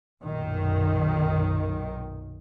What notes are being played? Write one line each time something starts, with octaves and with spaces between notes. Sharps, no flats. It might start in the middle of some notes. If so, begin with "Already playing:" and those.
B1 F#2 A#2 D#3